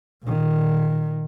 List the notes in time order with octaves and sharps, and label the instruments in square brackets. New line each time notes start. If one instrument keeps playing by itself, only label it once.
[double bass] A#2 D#3